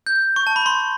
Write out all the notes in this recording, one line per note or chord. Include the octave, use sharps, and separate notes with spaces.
G6
C#6
A5
B5
C6